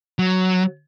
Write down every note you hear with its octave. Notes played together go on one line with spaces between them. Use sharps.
F#3